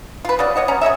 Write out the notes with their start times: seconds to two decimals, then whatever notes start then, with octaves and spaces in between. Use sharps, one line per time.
0.25 F4 B4
0.39 C#3 F#4 D5
0.56 C#5 D#5 F#5
0.68 C#4 F#5 A#5
0.81 G#4 C#5 D#5 E5